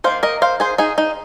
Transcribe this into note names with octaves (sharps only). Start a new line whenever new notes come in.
D#3 A#3 D#4 C5 F5
A#4 D#5
C5 F5
G#4 C5
D#4 G#4
D#4